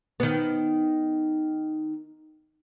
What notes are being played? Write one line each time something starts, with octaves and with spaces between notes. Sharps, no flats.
D#3 B3